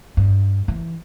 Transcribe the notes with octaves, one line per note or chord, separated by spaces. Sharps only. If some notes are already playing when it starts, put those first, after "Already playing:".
G2
E3